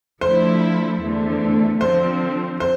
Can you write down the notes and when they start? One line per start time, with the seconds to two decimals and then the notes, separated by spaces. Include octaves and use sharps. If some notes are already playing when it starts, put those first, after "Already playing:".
0.21 D3 F3 A3 E4 C5
1.01 E2 D3 A3
1.81 D3 F3 C4 C5
2.60 C5